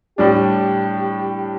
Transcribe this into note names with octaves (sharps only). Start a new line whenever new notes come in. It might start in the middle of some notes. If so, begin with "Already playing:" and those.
A2 G3 D4 G4